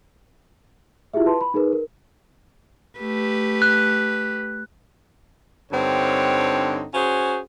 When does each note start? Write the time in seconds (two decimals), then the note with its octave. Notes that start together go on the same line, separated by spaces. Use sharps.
1.14 E4 F4 G4 G#4 E5
1.26 B4 A5 C6
1.41 B5
1.54 D#4 G#4 A#4 B4
1.73 A#4
2.99 A3 G4 B4
3.62 F#6
5.72 G2 D3 C4 D#4 C#5
6.94 C#4 F#4 G#4 C5